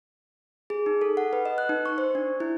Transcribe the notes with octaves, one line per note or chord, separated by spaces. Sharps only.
G#4
D#4
A4
F#5
B4
D#5
F#6
D#4
C#6
C5
D4
E4